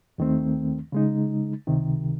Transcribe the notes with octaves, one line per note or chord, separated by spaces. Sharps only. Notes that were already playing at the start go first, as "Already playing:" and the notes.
D#2 D#3 A3 C4
C#3 G#3 D#4
C#2 C3 D#3